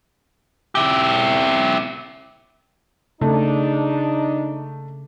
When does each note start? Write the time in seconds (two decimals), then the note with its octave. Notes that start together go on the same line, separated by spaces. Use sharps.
0.75 E4 G4
3.21 C#3 A3 D4 D#4